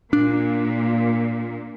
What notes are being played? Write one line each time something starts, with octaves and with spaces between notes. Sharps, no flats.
A#2 D4